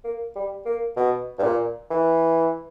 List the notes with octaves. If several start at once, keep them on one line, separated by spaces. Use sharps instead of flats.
A#3
G3
A#3
B2
G2
A#2
E3